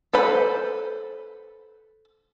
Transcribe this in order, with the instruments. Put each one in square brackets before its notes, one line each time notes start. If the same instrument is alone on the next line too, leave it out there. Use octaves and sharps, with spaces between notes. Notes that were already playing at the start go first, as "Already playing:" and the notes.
[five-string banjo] A4 B4 C5 B5